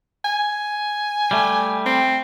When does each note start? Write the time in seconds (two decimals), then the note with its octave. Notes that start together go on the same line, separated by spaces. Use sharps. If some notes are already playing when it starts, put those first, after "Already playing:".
0.25 G#5
1.31 G3 A3
1.86 C4